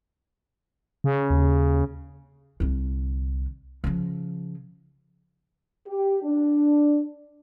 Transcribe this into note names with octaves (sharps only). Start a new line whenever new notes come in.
C#3
D#2
C2 D3
C#3 F3
G4
D4